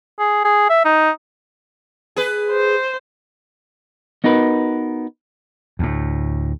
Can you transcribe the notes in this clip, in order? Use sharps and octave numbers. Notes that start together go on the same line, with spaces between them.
G#4
G#4
E5
D#4
G#4 B4
C5
B3 D#4 F#4 A#4 B4
D2 A2